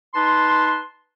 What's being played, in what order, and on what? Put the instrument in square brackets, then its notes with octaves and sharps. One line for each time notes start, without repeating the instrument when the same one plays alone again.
[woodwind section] D#4 B4 A5 C6